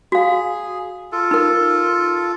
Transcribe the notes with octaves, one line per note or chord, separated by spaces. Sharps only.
F#4 G#4 F5
F4 A4
D#4 A#4